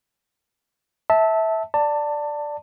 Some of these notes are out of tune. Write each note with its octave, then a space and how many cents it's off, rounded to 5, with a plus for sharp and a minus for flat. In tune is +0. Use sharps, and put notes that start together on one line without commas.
E5 -20 A5 +0
D5 +0 A5 +20